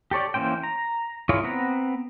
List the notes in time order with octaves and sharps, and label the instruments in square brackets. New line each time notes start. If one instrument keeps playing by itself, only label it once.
[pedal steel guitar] G4 A4 C#5 D5
E3 A#3 C#4 C5 G5
A#5
E4 F4 G#4 A#4 C#5
B3 C4 B4 F#5 A#5